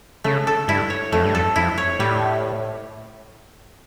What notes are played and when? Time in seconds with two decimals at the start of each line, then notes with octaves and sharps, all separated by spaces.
0.24 C#3 A3
0.47 A4
0.68 G2 E4
0.90 C#5
1.12 F2 A3
1.24 G2
1.35 F2 A4
1.56 F2 E4
1.78 C#5
1.99 A2 G3